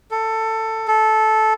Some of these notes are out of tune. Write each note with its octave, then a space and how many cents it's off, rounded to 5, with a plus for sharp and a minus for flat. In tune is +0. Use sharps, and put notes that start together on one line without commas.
A4 +15
A4 -15